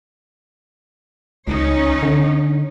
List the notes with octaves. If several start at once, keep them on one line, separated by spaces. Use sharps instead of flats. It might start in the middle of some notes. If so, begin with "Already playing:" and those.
C#2 C#4 D#4 C#5
D3